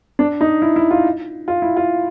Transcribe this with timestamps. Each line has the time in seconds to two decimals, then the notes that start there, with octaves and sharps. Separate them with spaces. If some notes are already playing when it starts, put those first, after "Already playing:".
0.19 D4
0.41 D#4
0.62 E4
0.76 E4
0.91 F4
1.48 F4
1.62 E4
1.77 F4